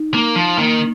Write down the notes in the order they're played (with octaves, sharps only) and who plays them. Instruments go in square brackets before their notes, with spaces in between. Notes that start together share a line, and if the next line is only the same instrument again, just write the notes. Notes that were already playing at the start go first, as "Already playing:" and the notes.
Already playing: [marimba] D#4
[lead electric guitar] A#3
F3
[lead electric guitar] D#3 [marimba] A#3